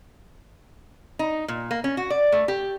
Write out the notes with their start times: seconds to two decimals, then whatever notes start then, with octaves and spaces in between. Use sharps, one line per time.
1.19 D#4
1.48 A#2
1.71 A#3
1.84 C#4
1.97 F#4
2.10 D5
2.32 A3
2.48 G4